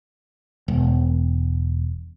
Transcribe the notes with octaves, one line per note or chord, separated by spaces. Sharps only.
E1